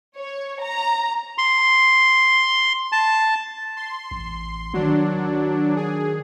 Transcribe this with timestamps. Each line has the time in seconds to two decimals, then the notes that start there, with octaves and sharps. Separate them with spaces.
0.17 C#5
0.62 A#5
1.38 C6
2.92 A5
3.76 C6
4.11 A1
4.74 D#3 F#3 D4
5.76 G#4